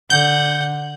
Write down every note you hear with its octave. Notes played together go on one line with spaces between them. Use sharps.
D3 F#5 G6